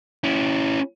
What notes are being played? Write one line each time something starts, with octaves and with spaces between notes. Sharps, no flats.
C#4 E4